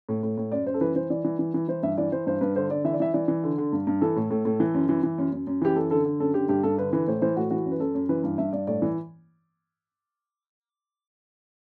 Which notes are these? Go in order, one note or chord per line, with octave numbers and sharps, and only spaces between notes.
A2
A2
A2
F#2 D5
F#2 C5
A4
E3 B4
E3 C5
E3 D5
E3
E3
E3
E3 C5
G2 E5
E3 D5
E3 C5
G2 C5
G2 B4
D3 C5
D3 D5
E3 E5
D5
E3 E5
E3 D5
E3
D3
D3
G2
G2
E3 A4
A2
A2
A2
E3
F#2
E3
E3
F#2
F#2
F#2
E3 G4
F#2 A4
D3 A4
D3
F#2 A4
D3 G4
G2 G4
G2 A4
D3 B4
E3 B4
A2 C5
E3 C5
A2 F#4
E3 F#4
F#2
B4
F#2 A4
F#2
E3 B4
G2
G2 E5
G2 D5
A2 D5
E3